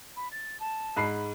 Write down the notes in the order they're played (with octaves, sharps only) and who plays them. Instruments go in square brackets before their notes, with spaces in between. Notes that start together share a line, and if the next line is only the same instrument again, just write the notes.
[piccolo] B5
A6
A5
[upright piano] G#2 B5 C7